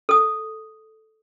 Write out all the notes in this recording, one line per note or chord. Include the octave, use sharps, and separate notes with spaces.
A4 D#6